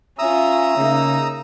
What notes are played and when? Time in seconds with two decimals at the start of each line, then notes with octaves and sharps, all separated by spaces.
0.19 C#4 F4 E5 A#5 D#6 E6
0.77 C#3 A#3 D#4